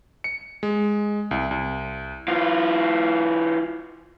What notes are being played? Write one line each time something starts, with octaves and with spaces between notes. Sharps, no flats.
C#7
G#3
C2
C2
E3 F4